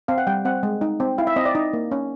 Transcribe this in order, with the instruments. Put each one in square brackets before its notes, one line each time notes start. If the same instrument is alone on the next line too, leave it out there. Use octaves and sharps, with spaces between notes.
[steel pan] C4 F5
F#5
G3 G5
C4 F#5
G#3
D#4
C4
E4 F5
E5
C4 D#5
D5
D#4 D#5
A#3
C#4